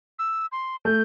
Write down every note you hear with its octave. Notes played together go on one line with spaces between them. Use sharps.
E6
C6
A3 G6